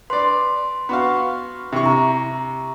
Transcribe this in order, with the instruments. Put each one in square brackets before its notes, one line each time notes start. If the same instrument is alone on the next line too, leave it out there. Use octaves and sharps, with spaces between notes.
[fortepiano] B4 D5 [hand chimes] C6
[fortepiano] B3 F#4 F5
C3 E4 C#6
[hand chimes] A#5